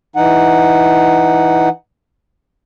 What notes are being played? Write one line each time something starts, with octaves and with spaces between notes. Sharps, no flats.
E3 D#4 F#5